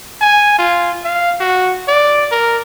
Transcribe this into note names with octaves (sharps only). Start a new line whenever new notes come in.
G#5
F4
F5
F#4
D5
A#4